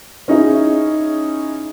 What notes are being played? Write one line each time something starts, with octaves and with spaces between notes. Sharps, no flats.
C#4 D#4 E4 G#4